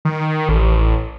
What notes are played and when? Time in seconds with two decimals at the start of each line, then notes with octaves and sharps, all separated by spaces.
0.05 D#3
0.49 A1